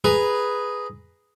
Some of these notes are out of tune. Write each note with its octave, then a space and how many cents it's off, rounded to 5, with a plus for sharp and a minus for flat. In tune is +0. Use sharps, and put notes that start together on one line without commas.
G#4 +0 B4 +0 A#5 +0